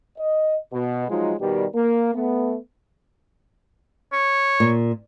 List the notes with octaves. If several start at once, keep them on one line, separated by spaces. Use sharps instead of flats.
D#5
B2
F3 F#3 G#3 D#4 F4
B2 D#3 G3
A#3
A3 B3
C#5
A#2